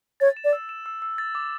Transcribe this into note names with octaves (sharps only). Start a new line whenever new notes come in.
C#5 A6
E7
D5
E6
E7
E6
E6
A6
D6